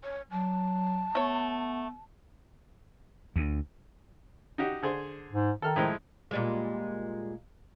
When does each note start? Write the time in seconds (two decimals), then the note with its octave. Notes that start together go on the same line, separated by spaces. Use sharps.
0.03 C#5
0.31 F#3 A5
1.15 A3 B3 C#5
3.36 D2
4.58 D#4 F#4 G4
4.82 D3 G#4 C5
5.31 G#2
5.62 D#3 A4 F6
5.76 A2 F3 G#3
6.31 A#2 G3 G#3